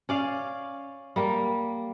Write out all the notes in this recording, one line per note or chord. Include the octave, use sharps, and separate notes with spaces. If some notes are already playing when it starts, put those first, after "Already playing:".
C#4 D5 F5
G3 A#3